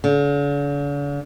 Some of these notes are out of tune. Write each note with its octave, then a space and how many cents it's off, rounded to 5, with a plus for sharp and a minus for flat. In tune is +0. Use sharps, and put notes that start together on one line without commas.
D3 -45